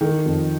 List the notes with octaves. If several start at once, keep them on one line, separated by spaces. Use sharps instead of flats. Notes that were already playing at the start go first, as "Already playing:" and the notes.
D#3
F2